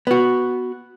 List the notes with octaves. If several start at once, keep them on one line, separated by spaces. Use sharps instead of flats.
B3 F#4